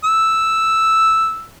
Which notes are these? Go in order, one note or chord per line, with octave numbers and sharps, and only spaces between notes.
E6